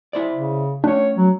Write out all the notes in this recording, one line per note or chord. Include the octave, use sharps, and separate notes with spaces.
E4 C5 D5
C#3
A3 C#4 D4 C#5
F#3